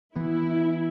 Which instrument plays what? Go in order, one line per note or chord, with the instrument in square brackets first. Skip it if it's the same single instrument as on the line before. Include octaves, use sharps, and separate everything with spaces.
[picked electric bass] E3 B3 [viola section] E4